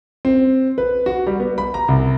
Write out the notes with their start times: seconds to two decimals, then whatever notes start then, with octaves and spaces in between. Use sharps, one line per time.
0.25 C4
0.78 B4
1.06 F#4
1.27 G3
1.40 B3
1.58 B5
1.74 A#5
1.88 C2